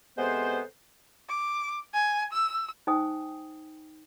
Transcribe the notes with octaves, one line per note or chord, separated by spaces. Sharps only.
C3 G#3 B3 A4 B4 C5
D6
G#5
E6
D#4 C5 G5 G#5 D#6